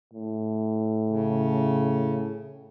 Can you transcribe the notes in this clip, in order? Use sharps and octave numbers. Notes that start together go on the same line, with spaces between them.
A2
C#3